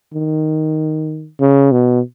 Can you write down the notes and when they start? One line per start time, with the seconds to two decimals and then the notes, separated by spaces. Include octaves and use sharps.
0.14 D#3
1.40 C#3
1.72 B2